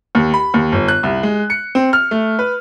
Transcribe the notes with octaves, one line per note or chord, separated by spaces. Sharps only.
D#2
B5
D#2
G1
F#6
C2
G#3
C#7
C4
F6
A3
B4